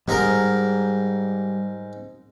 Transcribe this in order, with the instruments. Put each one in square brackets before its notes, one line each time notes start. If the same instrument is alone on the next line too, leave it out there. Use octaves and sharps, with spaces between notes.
[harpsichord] G#2 G#4 A#4 [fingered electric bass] G3